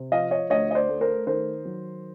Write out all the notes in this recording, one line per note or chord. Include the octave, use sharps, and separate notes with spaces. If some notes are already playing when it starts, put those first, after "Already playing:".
Already playing: C3
F3 D#5 F5
C#5 D#5
D2 C#5 D#5
D#5
C5 D5
A3
A#4 C5
D#3 A#4 C5
F#3